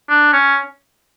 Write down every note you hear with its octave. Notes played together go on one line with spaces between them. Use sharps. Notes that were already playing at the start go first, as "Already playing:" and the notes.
D4
C#4